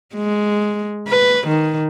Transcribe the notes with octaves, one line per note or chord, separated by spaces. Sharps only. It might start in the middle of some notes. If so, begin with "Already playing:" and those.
G#3
B4
D#3